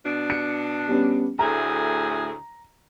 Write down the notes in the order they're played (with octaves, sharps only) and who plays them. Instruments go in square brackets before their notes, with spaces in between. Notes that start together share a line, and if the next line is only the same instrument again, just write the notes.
[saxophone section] B2 D4
[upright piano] C#7
G3 B3 C#4
[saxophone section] D2 A2 G#4 [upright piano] A#5